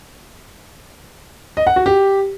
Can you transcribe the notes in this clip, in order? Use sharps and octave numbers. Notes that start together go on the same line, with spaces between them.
D#5
F#5
F#4
G4